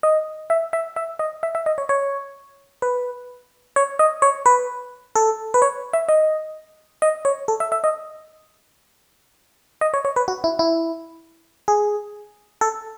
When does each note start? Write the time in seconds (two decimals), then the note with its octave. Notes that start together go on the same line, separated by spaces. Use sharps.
0.03 D#5
0.50 E5
0.73 E5
0.96 E5
1.19 D#5
1.43 E5
1.55 E5
1.66 D#5
1.78 C#5
1.89 C#5
2.82 B4
3.76 C#5
3.99 D#5
4.22 C#5
4.46 B4
5.16 A4
5.54 B4
5.62 C#5
5.93 E5
6.09 D#5
7.02 D#5
7.25 C#5
7.48 A4
7.60 E5
7.72 E5
7.84 D#5
9.81 D#5
9.94 C#5
10.05 C#5
10.16 B4
10.28 F#4
10.44 E4
10.59 E4
11.68 G#4
12.61 A4